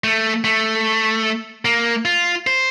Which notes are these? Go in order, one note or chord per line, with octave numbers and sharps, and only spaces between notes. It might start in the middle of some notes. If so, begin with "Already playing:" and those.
A3
A3
A#3
F4
C5